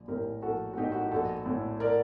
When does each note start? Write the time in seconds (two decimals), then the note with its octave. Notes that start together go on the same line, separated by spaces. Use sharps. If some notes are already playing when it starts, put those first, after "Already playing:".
Already playing: A#1
0.08 A2 G4 A#4
0.42 A#1 F#4 A4
0.73 F#4
0.77 A2 D#4 G4
0.92 F#4
1.01 G4
1.11 A#1 F#4 A4
1.46 A2
1.80 A#4 D5